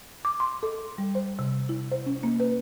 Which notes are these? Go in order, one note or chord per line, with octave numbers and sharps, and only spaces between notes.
D6
C6
A4
G3
C5
C3
E4
C5
C#4
A#3
B4